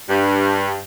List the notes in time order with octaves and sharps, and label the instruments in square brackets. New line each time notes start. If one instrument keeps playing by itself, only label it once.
[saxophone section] G2